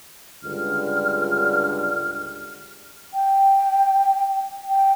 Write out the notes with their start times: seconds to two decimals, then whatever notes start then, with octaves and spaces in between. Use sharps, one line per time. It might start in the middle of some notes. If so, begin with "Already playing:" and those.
0.43 C#2 G2 D3 F6
3.14 G5
4.68 G5